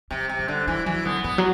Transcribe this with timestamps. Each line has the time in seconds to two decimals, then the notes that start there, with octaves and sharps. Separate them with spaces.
0.11 C3 G3
0.29 C3
0.39 G3
0.48 D3
0.67 E3 G3
0.86 E3 F#3
1.05 D3 B3
1.24 E3 B3
1.38 F#3